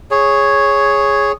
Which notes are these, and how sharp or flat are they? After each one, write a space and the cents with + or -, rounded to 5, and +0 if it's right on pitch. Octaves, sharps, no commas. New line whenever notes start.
G#4 +0 C#5 +0